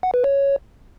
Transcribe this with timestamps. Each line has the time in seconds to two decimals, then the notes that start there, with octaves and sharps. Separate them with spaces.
0.03 F#5
0.14 B4
0.24 C#5